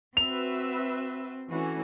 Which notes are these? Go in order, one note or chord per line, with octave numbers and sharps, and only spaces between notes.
C4 F#4 B4 E5 F7
E3 A3 C#4 F#4